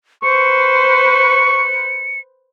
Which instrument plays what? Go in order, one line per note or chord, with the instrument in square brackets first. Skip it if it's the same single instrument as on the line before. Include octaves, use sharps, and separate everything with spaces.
[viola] B4 C5 [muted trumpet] C#6 [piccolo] C#7